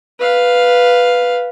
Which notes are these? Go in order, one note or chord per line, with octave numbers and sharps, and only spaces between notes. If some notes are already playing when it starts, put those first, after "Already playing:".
B4 F5